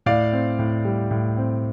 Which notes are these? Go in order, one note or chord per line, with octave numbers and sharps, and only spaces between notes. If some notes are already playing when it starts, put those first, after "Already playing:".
A2 D5 F5
C4
A2
G3
A2
C4